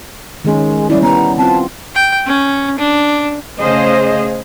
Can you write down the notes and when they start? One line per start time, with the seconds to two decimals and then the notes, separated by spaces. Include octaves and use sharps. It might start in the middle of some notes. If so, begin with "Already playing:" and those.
0.45 D#3 G#3 C#4
0.90 G3 C#4 E4 D5
1.03 B3 A#5
1.38 C4 F4 A5
1.95 G5
2.27 C#4
2.78 D4
3.60 C#3 A3 G#4 C5 D#5 F5